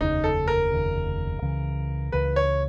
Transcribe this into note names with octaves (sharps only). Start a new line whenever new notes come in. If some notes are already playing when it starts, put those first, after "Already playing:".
F1 D#2 C#3 D#4
A4
A#4
F1 D#2 C#3
C#2 C#3 E3
C#2 C#3 E3 B4
C#5